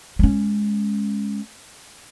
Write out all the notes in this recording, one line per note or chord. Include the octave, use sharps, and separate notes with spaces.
G#3 C#4